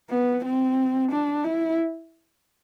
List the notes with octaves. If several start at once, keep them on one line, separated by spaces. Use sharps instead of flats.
B3
C4
D4
E4